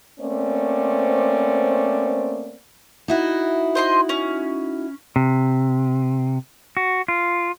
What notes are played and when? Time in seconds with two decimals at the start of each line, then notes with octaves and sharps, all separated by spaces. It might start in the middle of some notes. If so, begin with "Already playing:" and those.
0.20 A3 A#3 C4 C#4 C5 D5
3.08 D#4 E4 F#4
3.75 C5 D#5 C6
4.09 C#4
5.16 C3
6.77 F#4
7.08 F4